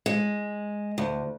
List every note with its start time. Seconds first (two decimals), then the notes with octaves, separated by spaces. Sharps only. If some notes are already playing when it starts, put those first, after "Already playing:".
0.06 G#3
0.98 D2